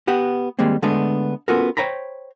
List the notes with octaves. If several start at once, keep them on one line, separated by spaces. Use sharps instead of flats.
B3 G4 F#5
D#3 G3 G#3 A#3 C4
D3 G#3 A3 B3 D4
B3 C#4 F4 F#4 A4 A#4
C5 C#5 G5 A#5 B5